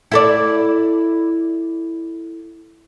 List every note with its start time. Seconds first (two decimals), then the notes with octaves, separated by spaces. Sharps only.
0.12 E4 A4 D5